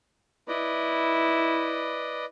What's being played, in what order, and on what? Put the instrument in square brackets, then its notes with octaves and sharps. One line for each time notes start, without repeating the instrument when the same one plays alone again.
[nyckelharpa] E4 [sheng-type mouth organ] B4 D5 D#5